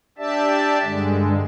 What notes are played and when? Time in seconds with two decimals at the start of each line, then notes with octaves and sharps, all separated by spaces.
0.18 D4 G4 D5 E5 A5
0.82 G2 D3 G#3